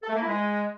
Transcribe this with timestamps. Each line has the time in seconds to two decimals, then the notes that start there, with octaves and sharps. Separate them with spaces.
0.03 A4
0.09 A3
0.15 A#3
0.21 E4
0.27 G#3